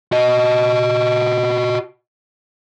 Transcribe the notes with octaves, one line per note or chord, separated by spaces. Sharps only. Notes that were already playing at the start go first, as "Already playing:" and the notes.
F#4 D#5